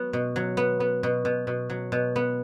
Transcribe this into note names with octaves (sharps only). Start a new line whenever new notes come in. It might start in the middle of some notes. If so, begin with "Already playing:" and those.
Already playing: F#3 B3
B2
F#3
B3
B3
B2
B2
B2
F#3
B2
B3